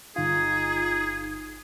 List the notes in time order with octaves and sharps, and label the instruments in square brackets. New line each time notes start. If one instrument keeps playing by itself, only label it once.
[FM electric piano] G1 F4 [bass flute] D#4 [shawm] G#4